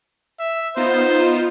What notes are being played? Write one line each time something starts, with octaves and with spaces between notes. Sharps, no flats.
E5
B3 D#4 F4 C5